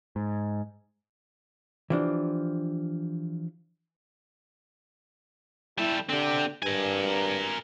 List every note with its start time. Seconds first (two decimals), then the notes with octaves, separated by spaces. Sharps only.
0.16 G#2
1.90 E3 F3 D4 G4
5.78 G3 E4 A4
6.09 D3 C4 G4
6.63 G2 A#4 G#5